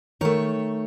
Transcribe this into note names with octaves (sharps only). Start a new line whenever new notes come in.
D#3 A3 C#5